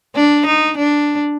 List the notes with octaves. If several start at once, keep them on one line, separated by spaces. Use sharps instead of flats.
D4
D#4
D4